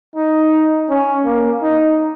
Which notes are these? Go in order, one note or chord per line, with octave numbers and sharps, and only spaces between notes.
D#4
C#4
A#3
D#4